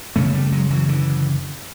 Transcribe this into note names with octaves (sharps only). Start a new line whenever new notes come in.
F#2 C#3 A3 B3
G3 A3
F#3 G#3
E3 F#3
D3 E3